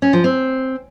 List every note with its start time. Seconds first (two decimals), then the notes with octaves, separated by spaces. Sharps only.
0.02 C#4
0.13 F3
0.24 C4